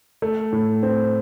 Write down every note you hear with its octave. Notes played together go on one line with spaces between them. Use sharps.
A3
A2
C4